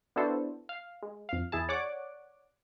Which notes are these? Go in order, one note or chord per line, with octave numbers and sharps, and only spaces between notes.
B3 D4 E4 F#4 A4 C5
F5
G#3
F2 F5
E2 E4 G#4 A5
C#5 D5 F#5 D6